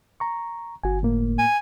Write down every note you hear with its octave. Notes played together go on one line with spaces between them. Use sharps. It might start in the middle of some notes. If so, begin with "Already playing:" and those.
A#5 C#6
G1 F#4 G#5
A2 A#3
G#5